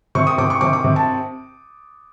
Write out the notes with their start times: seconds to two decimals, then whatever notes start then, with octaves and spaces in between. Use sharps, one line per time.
0.15 C3 C#6
0.27 D#6
0.38 C3 D6
0.50 C#6
0.61 C3 D6
0.73 D6
0.84 C3
0.96 A5